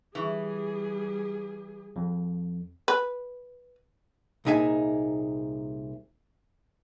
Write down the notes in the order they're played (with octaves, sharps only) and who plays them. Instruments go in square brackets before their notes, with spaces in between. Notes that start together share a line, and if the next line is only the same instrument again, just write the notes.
[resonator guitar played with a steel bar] E3 [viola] G3 G#4
[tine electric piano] F2
[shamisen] B4
[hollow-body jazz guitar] C2 A#2 D#4 G#4 E5 G#5